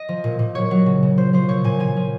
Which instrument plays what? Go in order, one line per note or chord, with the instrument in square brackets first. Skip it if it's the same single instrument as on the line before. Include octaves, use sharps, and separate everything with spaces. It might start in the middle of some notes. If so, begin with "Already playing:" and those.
Already playing: [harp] D#5
F3
A#2
A#2
F#3 C#5
F#3
C#3
C#3
F3 C5
F3 C5
A#2 C#5
A#2 G#5
F3 G#5
F3